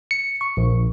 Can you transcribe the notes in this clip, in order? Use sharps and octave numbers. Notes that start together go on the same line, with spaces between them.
C#7
C#6
A#1